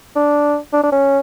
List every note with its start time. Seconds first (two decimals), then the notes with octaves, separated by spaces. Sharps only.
0.16 D4
0.73 D4
0.83 D4
0.92 C#4